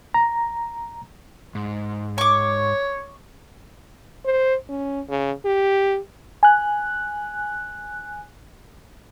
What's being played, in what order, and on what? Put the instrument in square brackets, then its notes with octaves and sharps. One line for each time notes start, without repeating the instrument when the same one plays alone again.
[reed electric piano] A#5
[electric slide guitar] G#2
[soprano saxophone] C#5 [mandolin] C#6 D6
[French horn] C5
C#4
C#3
G4
[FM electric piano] G#5 F#6